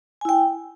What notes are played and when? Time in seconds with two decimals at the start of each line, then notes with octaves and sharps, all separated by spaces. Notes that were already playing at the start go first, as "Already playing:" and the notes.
0.21 G#5
0.25 E4
0.29 G5